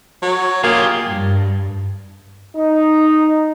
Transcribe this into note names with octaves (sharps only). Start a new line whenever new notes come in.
F#3
A#3 F4 G4 G#4
G2
D#4